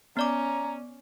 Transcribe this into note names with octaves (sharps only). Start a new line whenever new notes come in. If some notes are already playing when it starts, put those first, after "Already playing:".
B3 C#4 D5 A#5 D6